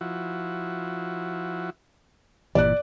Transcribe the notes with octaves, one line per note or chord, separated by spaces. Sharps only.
F3 E4 F#4
G1 A#2 E3 D5 F#6